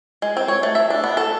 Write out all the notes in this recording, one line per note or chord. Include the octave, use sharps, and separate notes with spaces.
G#3
C4
C#5
A3
E5
D4
B3
A4